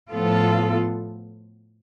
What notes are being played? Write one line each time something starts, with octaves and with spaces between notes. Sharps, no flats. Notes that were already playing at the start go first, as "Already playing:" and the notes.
A2 F3 B3 F4 A4